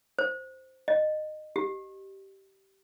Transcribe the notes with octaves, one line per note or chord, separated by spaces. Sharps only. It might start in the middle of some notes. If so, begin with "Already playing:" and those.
C5
D#5
G4